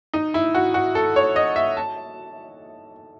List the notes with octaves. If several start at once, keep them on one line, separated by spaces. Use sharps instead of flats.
D#4
E4
F#4
F#4
A4
C#5
D#5
E5
A5